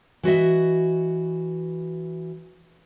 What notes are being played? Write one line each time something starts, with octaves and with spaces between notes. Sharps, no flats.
E3 F#4 D#5 E5